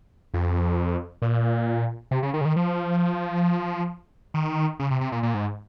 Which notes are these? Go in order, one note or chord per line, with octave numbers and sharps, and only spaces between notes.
F2
A#2
C3
C#3
D#3
C#3
D#3
F3
D#3
C#3
C3
C3
A#2
A#2
G#2